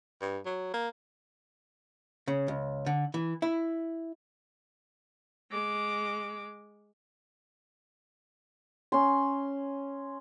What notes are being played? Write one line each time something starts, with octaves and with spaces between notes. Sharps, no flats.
G2
F#3
A#3
C#3
C#2
D3
E3
E4
G#3 D6
C#4 C6